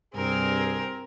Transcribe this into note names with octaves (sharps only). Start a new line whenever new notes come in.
C2 G2 C4 G#4 A#4